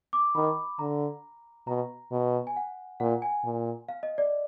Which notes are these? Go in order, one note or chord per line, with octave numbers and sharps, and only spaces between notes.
D6
D#3 B5
D3 A#5
B2 A#5
B2
G#5
F#5
A#2 F#5
G#5
A#2
F5
D#5
D5